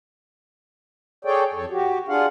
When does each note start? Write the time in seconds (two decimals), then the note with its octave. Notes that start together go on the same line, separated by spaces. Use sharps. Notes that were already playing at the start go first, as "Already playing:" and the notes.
1.25 G#4 A4 C#5 D5 G5
1.54 F2 A4 C#5
1.71 F#4 G4
2.08 D4 F4 G#4 F5 F#5